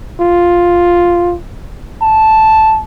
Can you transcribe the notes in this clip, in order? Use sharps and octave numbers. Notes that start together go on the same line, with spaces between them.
F4
A5